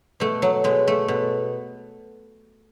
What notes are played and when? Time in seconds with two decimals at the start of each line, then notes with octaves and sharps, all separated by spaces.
0.20 B2 A3
0.42 F#3
0.64 B2 G#3
0.88 A3
1.08 B2